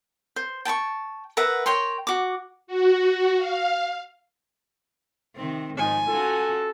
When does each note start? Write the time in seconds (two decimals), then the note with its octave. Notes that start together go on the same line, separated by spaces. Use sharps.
0.36 C5
0.65 G5 A5 B5 C#6
1.37 A#4 B4 E5 F#5
1.66 A#4 C#5 G5 C6
2.07 F#4 D6
2.67 F#4
3.37 F5
5.35 C3 D#3 C4
5.78 G#2 D#3 F3 D#4 G#5
6.09 C#4 F4 F#4 A4